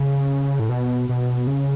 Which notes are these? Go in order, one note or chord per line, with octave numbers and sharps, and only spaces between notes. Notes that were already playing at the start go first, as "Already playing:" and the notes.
Already playing: C#3
A2
B2
B2
C#3